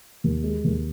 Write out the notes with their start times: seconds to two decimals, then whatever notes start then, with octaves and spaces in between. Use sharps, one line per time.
0.24 D#2
0.43 G#3
0.64 D#2